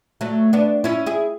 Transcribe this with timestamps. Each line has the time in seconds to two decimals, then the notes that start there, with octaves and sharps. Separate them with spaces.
0.21 F#3 A3
0.53 B3 D4
0.84 C#4 E4
1.06 E4 G#4